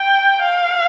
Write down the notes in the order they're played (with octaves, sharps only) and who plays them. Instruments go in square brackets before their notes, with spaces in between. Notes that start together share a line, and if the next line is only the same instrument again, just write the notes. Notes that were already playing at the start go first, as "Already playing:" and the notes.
Already playing: [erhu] G5
F5